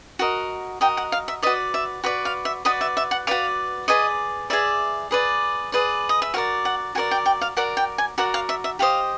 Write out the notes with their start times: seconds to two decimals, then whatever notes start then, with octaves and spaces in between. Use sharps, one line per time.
0.19 F#4 A#4 D#5
0.81 F#4 A#4 D#5 G5
0.97 F#5
1.12 F5
1.28 E5
1.42 F#4 B4 D5 D#5
1.74 E5
2.04 F#4 B4 D5
2.25 F5
2.45 E5
2.65 F#4 B4 D5 D#5
2.81 E5
2.97 E5
3.11 F#5
3.27 F#4 B4 D5 F5
3.88 G#4 B4 D5 D#5
4.50 G#4 B4 D5 E5
5.11 G#4 B4 D5
5.72 G#4 B4 D5
6.09 D#5
6.22 E5
6.34 F#4 A#4 D5 F5
6.65 F#5
6.95 F#4 A#4 D5 G#5
7.11 G5
7.26 G5
7.41 F5
7.57 F#4 A#4 D5 F#5
7.77 G5
7.98 G#5
8.18 F#4 A#4 D5 F#5
8.34 F5
8.49 E5
8.64 E5
8.79 G4 C5 D#5 F5